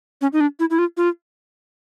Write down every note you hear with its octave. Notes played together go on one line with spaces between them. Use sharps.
C#4
D#4
D4
E4
E4
F4
F4